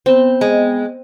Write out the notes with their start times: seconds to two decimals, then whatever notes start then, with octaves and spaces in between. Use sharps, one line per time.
0.06 B3 C4 G5
0.41 G#3